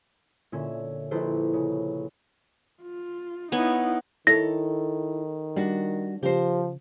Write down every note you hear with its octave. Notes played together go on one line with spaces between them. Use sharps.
A#2 D3 C#4 E5
A#1 E4 A4 B4 C5
C#3
F4
B3 D#4 E4 C#5 G#5
D#3 E4 A4 C#5 A#6
G3 D4 F#4
C#3 F3 G4 A#4 C5